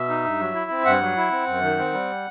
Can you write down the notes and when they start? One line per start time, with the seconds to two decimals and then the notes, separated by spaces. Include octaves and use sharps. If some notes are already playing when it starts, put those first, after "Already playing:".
Already playing: B2 E5
0.09 D#4
0.25 G2
0.40 F#3
0.55 E4
0.71 C4
0.85 G2 F#5
1.01 F#3
1.17 E4
1.32 C4
1.47 F#2
1.62 D#3
1.78 C4
1.93 G3